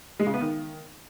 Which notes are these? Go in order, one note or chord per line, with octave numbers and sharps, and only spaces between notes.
G#3
C#3
B3
D#3